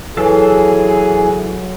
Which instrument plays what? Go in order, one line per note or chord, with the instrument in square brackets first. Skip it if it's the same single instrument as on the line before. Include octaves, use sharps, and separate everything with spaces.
[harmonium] E3 [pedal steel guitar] F#3 A4 F5 [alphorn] G#4